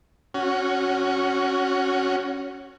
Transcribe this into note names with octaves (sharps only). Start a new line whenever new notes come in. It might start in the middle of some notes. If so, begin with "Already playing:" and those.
C#4 F#4